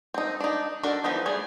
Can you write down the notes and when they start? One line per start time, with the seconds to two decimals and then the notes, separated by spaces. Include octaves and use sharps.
0.14 C4 D#4
0.40 D4 D#4
0.83 D4 F#4 A4 A#4
1.04 E3 F3 B3 D#4
1.26 G3 A3 D4 G#4